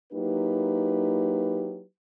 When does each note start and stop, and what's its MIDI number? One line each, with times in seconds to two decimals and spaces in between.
0.13 1.81 54
0.13 1.81 58
0.13 1.81 63
0.13 1.81 64
0.13 1.81 67
0.13 1.81 71